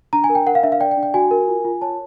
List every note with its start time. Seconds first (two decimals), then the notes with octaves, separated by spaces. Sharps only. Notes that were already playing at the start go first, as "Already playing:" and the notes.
0.13 D4 A#5
0.24 G#5
0.29 A#4
0.35 G5
0.46 A#4 F#5
0.55 F5
0.63 D4 E5
0.72 F5
0.80 D5 G5
0.91 G5
0.97 D4
1.03 G5
1.14 F#4 G#5
1.31 A#4
1.48 F4
1.65 F4
1.81 C#5 A5